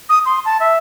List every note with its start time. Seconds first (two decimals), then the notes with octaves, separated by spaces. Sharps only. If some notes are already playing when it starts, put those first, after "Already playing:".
0.09 D#6
0.25 C6
0.45 A5
0.60 E5